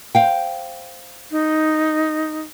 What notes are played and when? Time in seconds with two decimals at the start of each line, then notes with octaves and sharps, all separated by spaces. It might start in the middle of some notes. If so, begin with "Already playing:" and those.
0.15 C5 F5 G5
1.31 D#4